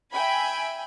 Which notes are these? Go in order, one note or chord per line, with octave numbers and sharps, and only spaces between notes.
E5 G5 G#5 B5